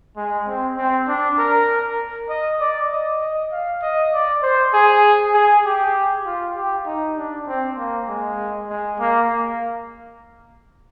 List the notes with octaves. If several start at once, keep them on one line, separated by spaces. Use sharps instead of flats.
G#3
C4
C4
D4
A#4
D#5
D5
D#5
D#5
F5
D#5
D5
C5
G#4
G#4
G4
F4
G4
D#4
D4
C4
A#3
G#3
G#3
A#3